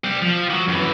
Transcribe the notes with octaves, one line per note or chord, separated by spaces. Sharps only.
G3 C4
F3
E3 F#3
F#2 E3